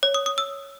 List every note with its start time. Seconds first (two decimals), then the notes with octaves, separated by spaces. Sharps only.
0.03 C#5
0.14 D#6
0.26 D#6
0.38 E6